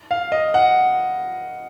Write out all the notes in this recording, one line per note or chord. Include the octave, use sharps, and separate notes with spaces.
F5
D#5
F#5